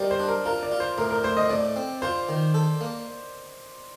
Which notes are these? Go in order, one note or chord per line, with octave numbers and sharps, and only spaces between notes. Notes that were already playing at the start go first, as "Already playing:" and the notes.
Already playing: G3 A#4 C5 D5 D#5
C5
D4
A#4
F4 A#4
D5
F4
C5
A2 A#4
A#4
A2 C5
D#5
A2 D5
C4
F4 C5
D#3
A4
A#3